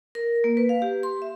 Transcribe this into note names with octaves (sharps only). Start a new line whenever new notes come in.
A#4
A#3
B4
F5
G4
C6
E5